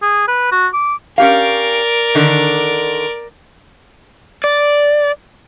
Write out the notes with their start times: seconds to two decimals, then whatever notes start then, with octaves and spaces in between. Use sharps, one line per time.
0.02 G#4
0.28 B4
0.52 F#4
0.73 D6
1.18 C#4 G4 A#4 D5 F5
2.15 D3 D#3
4.44 D5